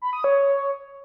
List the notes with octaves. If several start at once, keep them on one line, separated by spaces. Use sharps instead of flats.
B5
D#6
C#5